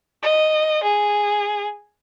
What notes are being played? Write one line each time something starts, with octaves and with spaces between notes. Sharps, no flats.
D#5
G#4